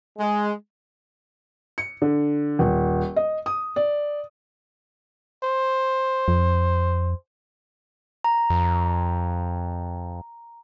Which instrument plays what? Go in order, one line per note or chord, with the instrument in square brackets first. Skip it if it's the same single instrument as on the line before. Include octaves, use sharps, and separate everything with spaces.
[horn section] G#3
[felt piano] C#7
D3
D#1
D#5
D#6
D5
[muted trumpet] C5
[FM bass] F2
[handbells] A#5
[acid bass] F2